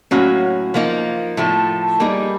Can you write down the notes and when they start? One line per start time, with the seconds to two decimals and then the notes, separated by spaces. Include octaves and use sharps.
0.11 A2 F#3 A#3 C#4 F#4
0.74 F3 A#3 D#4
1.37 A2 F3 A3
2.00 G3 A#3 D#4 G#4